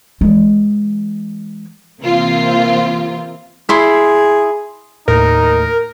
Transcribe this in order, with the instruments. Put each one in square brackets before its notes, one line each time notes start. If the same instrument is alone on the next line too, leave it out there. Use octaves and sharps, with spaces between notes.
[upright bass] E3 G#3
[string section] C3 E3 A#3 C4 F4
[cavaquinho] E4 C6 [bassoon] G#4
[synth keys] D#2 A2 [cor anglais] D#4 [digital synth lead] A#4